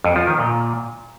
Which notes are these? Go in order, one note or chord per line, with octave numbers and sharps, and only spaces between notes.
F2
F3
D#3
A#2